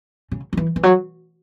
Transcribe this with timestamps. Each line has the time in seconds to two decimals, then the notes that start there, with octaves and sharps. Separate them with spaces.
0.31 C#3
0.53 F#3
0.57 E3
0.76 E3
0.83 F#3